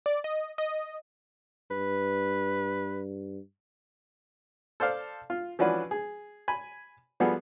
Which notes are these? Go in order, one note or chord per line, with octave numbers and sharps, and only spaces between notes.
D5
D#5
D#5
G2 B4
A4 C5 D5 F5
F4
E3 F3 C#4 D4 F#4 B4
G#4
G#5 B5
F3 G3 B3 F#4 G#4 A4